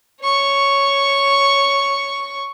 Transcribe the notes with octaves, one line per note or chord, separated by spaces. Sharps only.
C#5 C#6